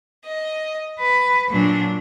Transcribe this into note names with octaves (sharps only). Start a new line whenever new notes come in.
D#5
B4
A#2 F#3 D4